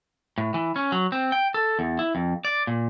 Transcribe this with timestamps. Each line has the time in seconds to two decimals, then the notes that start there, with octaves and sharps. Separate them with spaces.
0.38 A2
0.54 E3
0.76 C#4
0.92 F#3
1.12 C4
1.32 G5
1.54 A4
1.79 E2
1.99 E4
2.15 F2
2.45 D5
2.67 A#2